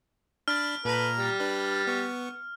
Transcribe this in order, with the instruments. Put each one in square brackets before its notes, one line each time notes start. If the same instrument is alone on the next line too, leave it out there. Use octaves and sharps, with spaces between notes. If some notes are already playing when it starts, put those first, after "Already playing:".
[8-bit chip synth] D4 B5 A6 [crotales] F6
[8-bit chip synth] A#2 A#5 [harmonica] A4 B4
[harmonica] G3
[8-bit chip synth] D4 B4
B3 C#6